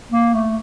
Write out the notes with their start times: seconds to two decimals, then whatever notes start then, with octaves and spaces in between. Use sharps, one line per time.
0.12 A#3
0.34 A3